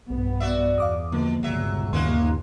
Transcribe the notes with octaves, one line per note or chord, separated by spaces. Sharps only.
B1 G2 B3
F#4 D5 E5
E2 F5 D6 D#6
B2 D3 F3 A#3
G1 C#2 A#2 F#3 E5
D#2 A#3 B3 C#4 C6 F#6